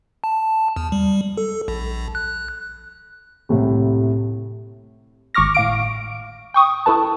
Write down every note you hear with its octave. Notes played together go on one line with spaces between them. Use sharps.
A5
E2
G3
A4
A#1
F#6
C2 A2 C3
G#1 C#6 D6 F6 A#6
A2 F5 D7
G5 C#6 D#6
E4 A4 B4 A5